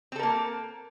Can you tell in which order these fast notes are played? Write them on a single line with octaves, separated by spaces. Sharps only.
C4 A4 A#4 A#3